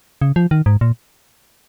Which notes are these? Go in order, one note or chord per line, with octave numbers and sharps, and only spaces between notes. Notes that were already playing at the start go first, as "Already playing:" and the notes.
C#3
F3
D#3
G#2
A#2